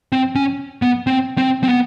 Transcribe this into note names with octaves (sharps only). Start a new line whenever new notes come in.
C4
C#4
B3
C4
C4
C4
B3